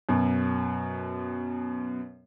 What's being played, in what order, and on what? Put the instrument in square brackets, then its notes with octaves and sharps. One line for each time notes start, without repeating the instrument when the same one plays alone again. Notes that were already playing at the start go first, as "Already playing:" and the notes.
[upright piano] F#2 B2